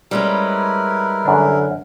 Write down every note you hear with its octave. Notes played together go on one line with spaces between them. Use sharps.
G3 G#3 C#4 E4 A#4 B4
F#2 D3 D4